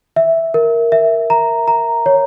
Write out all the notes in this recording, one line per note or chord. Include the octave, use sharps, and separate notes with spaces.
E5
A#4
E5
A#5
A#5
C#5